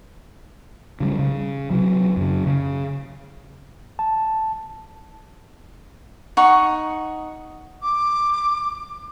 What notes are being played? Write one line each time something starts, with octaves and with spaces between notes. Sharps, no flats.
C#3 F#3 G3
C#3
C3 F#3
F#2 C#3
C#3
A5
D#4 F#5 C#6
D6